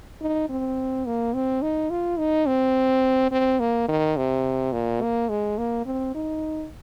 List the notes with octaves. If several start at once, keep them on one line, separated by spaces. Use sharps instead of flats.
D#4
C4
A#3
C4
D#4
F4
D#4
C4
C4
A#3
D#3
C3
A#2
A#3
G#3
A#3
C4
D#4